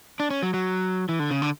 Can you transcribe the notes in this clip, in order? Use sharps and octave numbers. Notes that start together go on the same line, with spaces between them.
D4
C#4
F#3
F#3
E3
D3
C#3
D3